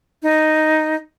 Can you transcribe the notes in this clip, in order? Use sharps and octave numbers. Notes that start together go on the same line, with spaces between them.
D#4